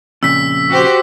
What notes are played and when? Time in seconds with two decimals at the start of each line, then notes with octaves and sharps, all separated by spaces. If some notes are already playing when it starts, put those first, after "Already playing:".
0.23 F2 A#2 C#3 E6 B6
0.70 F#4 G4 C5